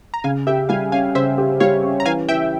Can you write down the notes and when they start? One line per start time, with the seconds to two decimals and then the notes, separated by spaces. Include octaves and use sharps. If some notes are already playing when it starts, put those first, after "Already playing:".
0.14 A#5
0.24 C#3 F5 G#5
0.47 G4 E5 G5
0.69 G3 F5 G#5
0.92 C#4 F5 G#5
1.15 C#3 C5 E5
1.38 G4
1.60 G3 C#5 F5
1.83 C#4
2.00 A#5
2.05 E3 F5 G#5
2.28 E3 E5 G5